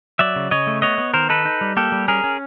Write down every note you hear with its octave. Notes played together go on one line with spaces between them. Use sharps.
F#3 D5 E5
C#3
C#3 C#5 D#5
A3
B3 C#5 D#5
B3
D#3 A#4 C5
D#4 A4 B4
D#4
G3
A#3 G4 A4
G3
C#4 G#4 A#4
C#4